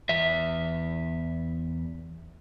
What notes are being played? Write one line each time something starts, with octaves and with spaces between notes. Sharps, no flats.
E2 E5